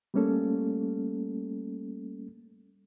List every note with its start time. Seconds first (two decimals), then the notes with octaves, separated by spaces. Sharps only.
0.14 G3 A3 A#3 C#4 A4